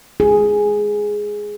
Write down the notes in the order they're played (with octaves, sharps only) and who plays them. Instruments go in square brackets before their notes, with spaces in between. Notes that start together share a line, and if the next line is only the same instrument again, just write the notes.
[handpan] G#4